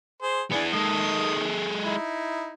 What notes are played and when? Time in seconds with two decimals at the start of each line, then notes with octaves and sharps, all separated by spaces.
0.22 G#4 C5
0.52 E3 B3 D4 G#4
0.73 D#3 G#3 A4 D#6
1.86 D#4 E4